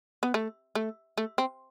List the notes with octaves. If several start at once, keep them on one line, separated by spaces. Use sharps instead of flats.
B3
A3
A3
A3
C4